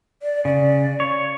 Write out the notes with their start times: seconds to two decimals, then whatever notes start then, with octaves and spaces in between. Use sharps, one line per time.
0.23 D5
0.45 C#3 D5
1.00 C#5